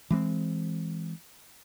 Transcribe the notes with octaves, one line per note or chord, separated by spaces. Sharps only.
E3 G#3 C4